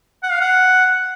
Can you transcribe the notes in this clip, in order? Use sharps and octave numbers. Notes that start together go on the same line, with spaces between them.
F#5
F5
F#5